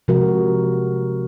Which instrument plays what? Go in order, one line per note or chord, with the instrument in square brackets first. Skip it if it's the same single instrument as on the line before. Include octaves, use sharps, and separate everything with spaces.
[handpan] C3 F3 G#3 F#4 A#4